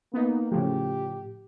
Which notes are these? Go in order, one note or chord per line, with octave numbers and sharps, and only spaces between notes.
A#3 B3 D#4
A2 C#3 F3 G4